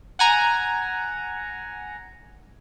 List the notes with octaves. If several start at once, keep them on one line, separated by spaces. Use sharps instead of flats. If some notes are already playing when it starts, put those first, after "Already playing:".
F#5 G#5 A#5